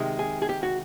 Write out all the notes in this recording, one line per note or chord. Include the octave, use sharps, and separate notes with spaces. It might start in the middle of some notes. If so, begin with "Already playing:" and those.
Already playing: C3 D#3 G#3
G#4
G#4
G4
F#4